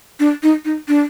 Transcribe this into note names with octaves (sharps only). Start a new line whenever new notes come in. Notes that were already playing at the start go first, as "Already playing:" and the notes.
D4
D#4
D#4
D4